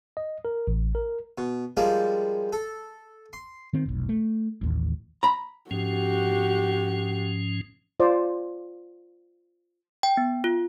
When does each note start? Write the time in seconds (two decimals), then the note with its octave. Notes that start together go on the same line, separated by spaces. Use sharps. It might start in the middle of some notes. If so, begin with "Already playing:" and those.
0.17 D#5
0.45 A#4
0.68 A1
0.95 A#4
1.38 B2
1.77 F3 G3 G#3 A#3 A#4
2.53 A4
3.33 C6
3.73 D#3 C4
3.86 F1 B1
4.09 A3
4.61 A1 D#2
5.23 A#5 B5
5.71 G#2 F3 C#4 F#4 G4
8.00 F4 C5 D5
10.03 G5
10.17 B3
10.44 F4